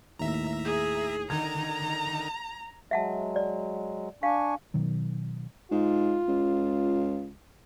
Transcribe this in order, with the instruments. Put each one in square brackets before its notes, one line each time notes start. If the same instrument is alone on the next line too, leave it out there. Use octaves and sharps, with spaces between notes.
[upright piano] D#2 A2 [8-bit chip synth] E5 A#5
[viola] G#4
[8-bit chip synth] D3 D#3 D#4 [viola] A#5 [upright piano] G#6
[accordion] F#3 G#3 [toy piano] E5 F#5 A5
[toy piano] D5
[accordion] D4 G#5 C#6 [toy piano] F5
[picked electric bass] B2 D#3 F#3
[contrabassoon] G#2 [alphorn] F4
[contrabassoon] C#2